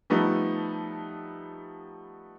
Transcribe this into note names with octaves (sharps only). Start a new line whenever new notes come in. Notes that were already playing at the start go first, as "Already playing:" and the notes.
F3 G3 A3 B3 D#4